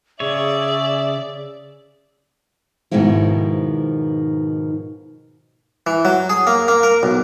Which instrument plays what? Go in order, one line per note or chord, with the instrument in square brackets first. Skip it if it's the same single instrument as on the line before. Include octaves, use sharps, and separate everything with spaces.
[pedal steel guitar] C#3 C#5 [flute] G#4 [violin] D5 [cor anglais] E5
[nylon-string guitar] G#2 B2 D#3 F3 G#3 E4
[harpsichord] E3
F#3
G#4
A#3
A#3
A#4
B1